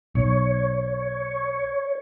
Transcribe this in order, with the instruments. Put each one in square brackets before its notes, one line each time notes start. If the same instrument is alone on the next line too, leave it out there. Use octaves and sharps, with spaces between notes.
[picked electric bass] B1 [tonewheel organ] C#5